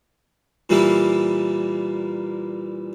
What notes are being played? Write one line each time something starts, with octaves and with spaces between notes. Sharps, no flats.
A#2 E3 G3 A#3 E4